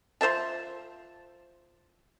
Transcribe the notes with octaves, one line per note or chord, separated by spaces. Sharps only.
F3 C5 E5 A5